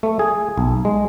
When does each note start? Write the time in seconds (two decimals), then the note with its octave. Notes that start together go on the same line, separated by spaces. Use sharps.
0.03 A3
0.19 G#4
0.58 B1
0.85 G#3